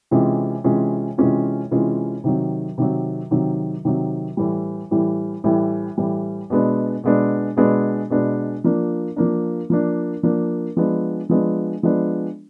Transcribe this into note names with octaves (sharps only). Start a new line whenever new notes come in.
C3 E3 G#3 C#4 F4
C3 E3 G#3 C#4 F4
C3 E3 G#3 C#4 F4
C3 E3 G#3 C#4 F4
C3 D#3 F#3
C3 D#3 F#3
C3 D#3 F#3
C3 D#3 F#3
A2 E3 G3
A2 E3 G3
A2 E3 G3
A2 E3 G3
B2 G#3 B3 D4
B2 G#3 B3 D4
B2 G#3 B3 D4
B2 G#3 B3 D4
F3 A#3 D4
F3 A#3 D4
F3 A#3 D4
F3 A#3 D4
F3 G#3 B3 D4
F3 G#3 B3 D4
F3 G#3 B3 D4